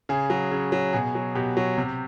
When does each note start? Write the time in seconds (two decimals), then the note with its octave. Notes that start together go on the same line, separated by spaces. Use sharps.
0.09 C#3 G#4
0.30 F#3
0.51 C#3
0.72 F#3
0.93 B2 G#4
1.15 F#3
1.35 B2 G4
1.57 F#3
1.77 C3